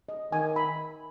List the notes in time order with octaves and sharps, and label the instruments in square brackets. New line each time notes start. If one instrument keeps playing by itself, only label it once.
[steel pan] D#5
[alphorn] D#3 [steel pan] G#5
[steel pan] B5